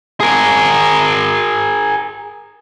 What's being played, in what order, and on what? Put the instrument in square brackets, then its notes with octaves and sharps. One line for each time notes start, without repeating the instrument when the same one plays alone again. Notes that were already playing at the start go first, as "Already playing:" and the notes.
[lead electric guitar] G#4 A#4